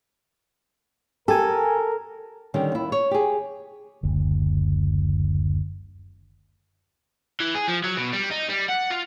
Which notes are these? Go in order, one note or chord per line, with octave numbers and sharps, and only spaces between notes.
G4 A4 A#4 G#5
D3 D#3 G3 C#4
D#2 E4
C#5
G4 G#4
F#1 D2
E3
G#4
F3
F#3
B2
G3
D#4
G3
F#5
F4